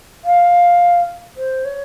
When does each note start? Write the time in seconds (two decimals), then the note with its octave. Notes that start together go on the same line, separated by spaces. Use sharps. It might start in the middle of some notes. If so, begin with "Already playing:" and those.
0.24 F5
1.37 C5
1.65 C#5